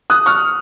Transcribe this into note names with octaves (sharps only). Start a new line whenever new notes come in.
D#6 F#6
C#6 F6